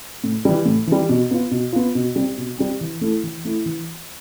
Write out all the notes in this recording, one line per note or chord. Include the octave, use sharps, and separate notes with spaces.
A2
E3 G3
A2
E3 G3
B2
B3 F4
B2
B3 F4
B2
G3 C4
B2
G3 C4
E3
A3 E4
E3
A3 E4
E3